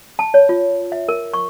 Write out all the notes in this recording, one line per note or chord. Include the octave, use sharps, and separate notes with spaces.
A5
C#5
F4
E5
A#4
C#6